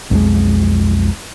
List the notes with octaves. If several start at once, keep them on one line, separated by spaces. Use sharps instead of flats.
B1 F2 G#3